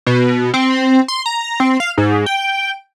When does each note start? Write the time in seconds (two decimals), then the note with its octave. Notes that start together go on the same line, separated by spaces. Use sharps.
0.06 B2
0.54 C4
1.08 C6
1.26 A#5
1.60 C4
1.80 F5
1.98 G#2
2.26 G5